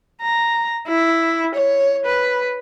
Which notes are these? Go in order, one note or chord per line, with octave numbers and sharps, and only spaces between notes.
A#5
E4
C#5
B4